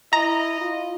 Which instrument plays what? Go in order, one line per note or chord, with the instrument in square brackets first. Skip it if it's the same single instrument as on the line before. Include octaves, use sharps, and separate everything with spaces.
[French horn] E4 [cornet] D#5 [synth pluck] A#5
[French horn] F4